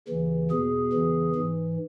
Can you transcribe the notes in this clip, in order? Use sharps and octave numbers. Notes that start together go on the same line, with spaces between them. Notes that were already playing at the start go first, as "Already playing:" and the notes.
D#2 C#3 E3
E2 B2 G#4
E2 C#3 E3
G#2 E3